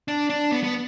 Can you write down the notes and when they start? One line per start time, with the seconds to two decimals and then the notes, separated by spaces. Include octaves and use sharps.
0.08 D4
0.30 D4
0.52 B3
0.64 B3